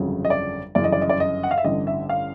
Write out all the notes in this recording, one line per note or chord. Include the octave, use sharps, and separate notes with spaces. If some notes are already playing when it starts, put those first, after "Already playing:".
Already playing: G1 F2 C#3 F#3
D#5
D5
G1 F#2 C#3 E3 D5
D#5
D5
D#5
D5
D#5
F#5
F5
E5
A1 G2 D3 D#5
E5
F5